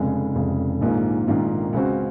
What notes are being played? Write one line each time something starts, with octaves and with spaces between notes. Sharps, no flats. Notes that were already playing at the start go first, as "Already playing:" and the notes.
Already playing: F1 F2 C#3 G#3
F1 F2 C#3 G#3
A#1 G#2 D#3 A#3 F4
A#1 G#2 D#3 A#3 F4
C#2 C#3 G#3 C4 F#4